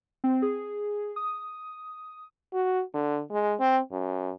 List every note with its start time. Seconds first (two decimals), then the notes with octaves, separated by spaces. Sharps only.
0.24 C4
0.42 G#4
1.16 D#6
2.54 F#4
2.94 D3
3.31 G#3
3.60 C4
3.92 F#2